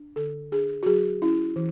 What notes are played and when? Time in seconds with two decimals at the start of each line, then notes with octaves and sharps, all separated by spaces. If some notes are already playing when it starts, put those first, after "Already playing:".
Already playing: D4
0.16 D3 A4
0.52 D4 G#4
0.83 F#4
0.86 F#3 G#4
1.22 C#4 E4
1.56 E3